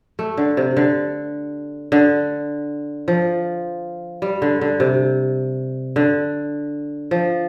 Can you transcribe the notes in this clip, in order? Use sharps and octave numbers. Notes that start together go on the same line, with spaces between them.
A3
D3
C3
D3
D3
F3
G3
D3
D3
C3
D3
F3